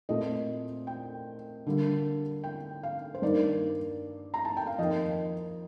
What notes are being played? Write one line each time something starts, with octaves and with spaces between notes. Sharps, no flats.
A#2 A3 C4 D#5
G5
D3 G3 A#3
G5
F5
C5
G2 D#3 A#3 D5
A#5
A5
G5
F5
F2 D#3 A#3 D#5